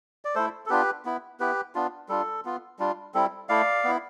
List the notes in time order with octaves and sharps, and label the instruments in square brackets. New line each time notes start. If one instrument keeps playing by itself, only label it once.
[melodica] D5
A3 E4 A4 C5
A4
B3 D4 F4 G4 B4
B3 E4
B3 E4 G4 B4
B3 D4 F4
G3 D4 F4 A4
B3 F4
G3 D4 F4
G3 C4 E4 A4
A3 E4 D5 F5
B3 E4